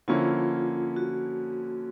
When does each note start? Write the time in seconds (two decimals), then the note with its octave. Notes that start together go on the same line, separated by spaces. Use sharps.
0.08 D3 F3 A#3 C#4 E4 F4
0.96 F#4